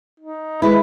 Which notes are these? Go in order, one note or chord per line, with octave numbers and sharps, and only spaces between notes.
D#4
D#3 G#3 E4 B4